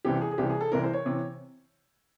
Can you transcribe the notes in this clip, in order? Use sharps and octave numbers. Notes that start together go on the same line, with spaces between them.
C2 C3 E3 G4
G#4
G#4
C2 C3 E3 G4
G#4
A4
C2 C3 E3 A#4
C5
C#5
C3 E3